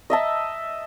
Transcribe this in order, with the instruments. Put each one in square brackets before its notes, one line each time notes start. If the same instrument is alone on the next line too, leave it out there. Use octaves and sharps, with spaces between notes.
[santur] D#5 E5 A5